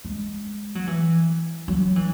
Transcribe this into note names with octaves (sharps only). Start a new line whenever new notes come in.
G#3
F#3
E3
F#3
E3